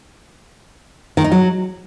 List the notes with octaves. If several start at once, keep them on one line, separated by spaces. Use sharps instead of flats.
D#3
D#4
F#3